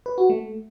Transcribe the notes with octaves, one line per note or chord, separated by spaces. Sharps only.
B4
F#4
A3